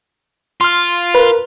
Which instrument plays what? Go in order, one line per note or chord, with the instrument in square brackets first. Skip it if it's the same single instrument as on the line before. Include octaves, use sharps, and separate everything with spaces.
[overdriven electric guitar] F4 [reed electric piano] C6 F6
[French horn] A#4 [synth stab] B4